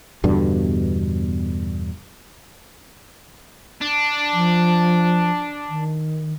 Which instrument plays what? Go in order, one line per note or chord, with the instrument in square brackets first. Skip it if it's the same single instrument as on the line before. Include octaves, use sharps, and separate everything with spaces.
[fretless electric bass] E2 G2 B2 D3
[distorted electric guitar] D4
[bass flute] F3
D#3